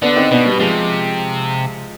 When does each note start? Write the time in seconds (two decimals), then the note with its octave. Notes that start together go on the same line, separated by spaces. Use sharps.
0.02 D3 B3 D4
0.16 C4 D#4
0.31 B2 B3 D4
0.45 G3 B3
0.60 C3 F3 G#3